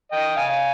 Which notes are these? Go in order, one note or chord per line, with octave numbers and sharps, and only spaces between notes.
D#5 G5
F5 G#5